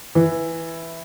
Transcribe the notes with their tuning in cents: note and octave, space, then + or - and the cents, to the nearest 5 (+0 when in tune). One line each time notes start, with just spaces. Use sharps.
E3 +0